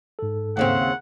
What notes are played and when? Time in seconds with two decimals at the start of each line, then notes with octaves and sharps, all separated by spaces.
0.19 G#2 A4
0.57 D#2 C#3 C4 F#5